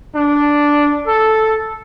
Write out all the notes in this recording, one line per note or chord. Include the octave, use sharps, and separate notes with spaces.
D4
A4